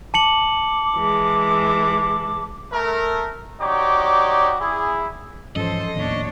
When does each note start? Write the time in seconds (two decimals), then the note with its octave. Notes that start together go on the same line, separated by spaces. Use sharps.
0.14 A5 D6 C#7 F#7
0.96 E3 G#3
2.72 A3 A#4
3.61 D#4 F#4 G4 C#5 D5 D6
4.61 E4 G#4
5.56 G#2 E3 F3 C#4 A4 C5 D#5
5.95 D#2 A2 D#3 B3 D4 C#5